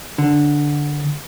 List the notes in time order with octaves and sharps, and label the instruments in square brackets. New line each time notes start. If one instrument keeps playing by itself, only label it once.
[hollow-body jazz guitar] D3